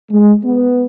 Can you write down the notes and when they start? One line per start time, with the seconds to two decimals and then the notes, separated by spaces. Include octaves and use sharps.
0.11 G#3
0.45 B3